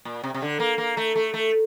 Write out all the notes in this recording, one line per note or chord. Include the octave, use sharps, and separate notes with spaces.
A#2
C3
C3
D3
A#3
A#3
A3
A3
A3